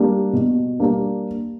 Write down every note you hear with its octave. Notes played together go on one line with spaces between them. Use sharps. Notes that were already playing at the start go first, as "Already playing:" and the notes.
Already playing: G3 A#3 D4
B2
G3 A#3 D4